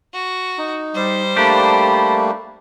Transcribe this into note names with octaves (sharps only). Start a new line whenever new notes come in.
F#4
D#4
G3 C5
G3 A3 A#3 D4 G4 A5 B5